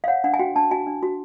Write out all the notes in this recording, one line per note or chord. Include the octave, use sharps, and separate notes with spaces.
F5
C#5 F#5
D4 F#5
G#5
F#4 G5
D4 A5
F#4 G#5
D4
F#4